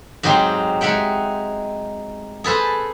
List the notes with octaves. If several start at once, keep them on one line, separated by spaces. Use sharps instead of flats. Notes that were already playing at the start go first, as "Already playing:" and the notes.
G#2 F#3 C4 D#4 G4 C6
G#3 D#4 E5 F#5 G5
G#4 A4 B4 C5